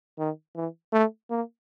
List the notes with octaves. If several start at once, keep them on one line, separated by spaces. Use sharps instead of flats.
D#3
E3
A3
A#3